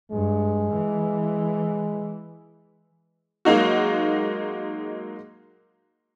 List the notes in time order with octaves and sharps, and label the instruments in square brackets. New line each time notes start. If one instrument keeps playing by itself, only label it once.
[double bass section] G2 [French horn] G#3
[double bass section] E3
[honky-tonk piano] F#3 G#3 A#3 D#4 F#4